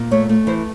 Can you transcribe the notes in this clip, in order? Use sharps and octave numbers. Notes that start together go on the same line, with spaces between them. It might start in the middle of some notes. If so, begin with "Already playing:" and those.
Already playing: A#2
A3 C#5
A3
E3 C5